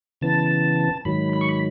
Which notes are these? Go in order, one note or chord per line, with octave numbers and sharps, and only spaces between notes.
C#3 E3 B3 A5
G#2 D#3 F#3 B5
B5
C#6
B5